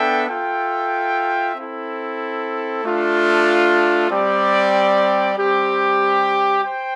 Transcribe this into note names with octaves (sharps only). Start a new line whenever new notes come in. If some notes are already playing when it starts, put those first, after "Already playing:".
Already playing: B3 D4 A4 E5 G5
F4 A4 E5 G5
C4 E4 A4
A3 D4 F4
G3 C4 G4 D5
G3 C4 G4
C5 G5